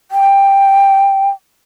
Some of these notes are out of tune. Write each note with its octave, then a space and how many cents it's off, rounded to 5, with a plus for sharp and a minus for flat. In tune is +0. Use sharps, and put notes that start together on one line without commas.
G5 +10